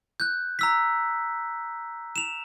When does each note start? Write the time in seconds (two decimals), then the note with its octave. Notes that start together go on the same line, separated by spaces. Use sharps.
0.20 F#6 G6
0.59 A#5 E6 B6
2.16 E7 F7